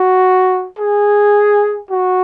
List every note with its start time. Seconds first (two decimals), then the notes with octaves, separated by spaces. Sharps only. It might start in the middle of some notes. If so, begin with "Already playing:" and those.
Already playing: F#4
0.79 G#4
1.90 F#4